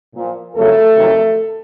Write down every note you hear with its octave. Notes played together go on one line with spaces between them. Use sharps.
A#2 F3
F2 C#3 F#3 A3 A4
F2 C3 D#3 F#3